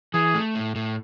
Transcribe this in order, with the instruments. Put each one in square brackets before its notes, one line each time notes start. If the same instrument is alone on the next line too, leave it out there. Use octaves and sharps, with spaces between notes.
[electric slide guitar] E3 [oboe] G#4
[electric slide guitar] A3
A2
A2